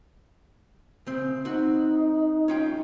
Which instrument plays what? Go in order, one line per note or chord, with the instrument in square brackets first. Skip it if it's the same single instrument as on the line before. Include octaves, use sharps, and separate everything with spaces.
[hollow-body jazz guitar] C#3 C4
[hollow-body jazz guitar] C4 F#4 [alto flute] D#4
[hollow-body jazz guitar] C#4 F4 G5